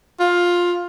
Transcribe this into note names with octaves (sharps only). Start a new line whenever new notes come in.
F4